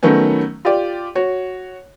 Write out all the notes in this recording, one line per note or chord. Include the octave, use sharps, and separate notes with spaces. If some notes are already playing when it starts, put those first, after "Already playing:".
D#3 F#3 A3 B3 C#4
F4 G4 D5
F#4 C#5